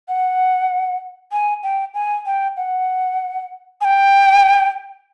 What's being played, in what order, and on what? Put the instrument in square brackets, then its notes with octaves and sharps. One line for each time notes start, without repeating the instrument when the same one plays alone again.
[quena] F#5
G#5
G5
G#5
G5
F#5
G#5
G5